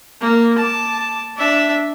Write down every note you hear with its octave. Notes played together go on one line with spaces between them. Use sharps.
A#3
A5 D6
D4 E5